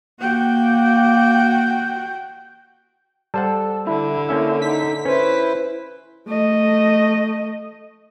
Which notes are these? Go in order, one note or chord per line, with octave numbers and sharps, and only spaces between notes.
A#3 F#4 G5
G3 A4 C5 F#5
D3 E4
A#3 C#4 E5
D#4 B6
C#4 E4 B4 C5
A3 D#5